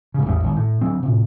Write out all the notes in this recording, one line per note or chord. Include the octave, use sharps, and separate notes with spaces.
G#2 C#3
A1 E2 G#2 G3
G#1
A2
D2 F#3 C4
A2 C3